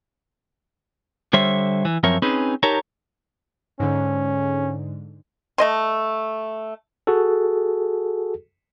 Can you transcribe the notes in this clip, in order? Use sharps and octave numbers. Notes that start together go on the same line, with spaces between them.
D3 G3 C5 C#5 E5
E3
F#2 F3 C4 A#4 C#5 E5
C4 C#4 D#4 G#4 B4
D#4 G4 A#4 C#5 A5 A#5
G#2 D3 C#4
A3 D#5 C6
F#4 G#4 A4